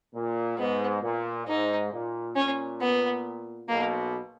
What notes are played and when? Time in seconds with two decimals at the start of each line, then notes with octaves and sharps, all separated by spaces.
0.14 A#2
0.58 G#2 B3
1.02 A#2
1.46 G#2 D#4
1.92 A#2
2.36 A#2 C#4
2.81 B3
3.69 B1 B2 A#3